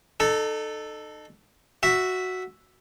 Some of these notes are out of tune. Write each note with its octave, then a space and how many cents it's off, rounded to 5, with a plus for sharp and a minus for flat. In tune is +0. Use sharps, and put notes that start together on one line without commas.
D#4 -35 A4 +0
F#4 +0 E5 +0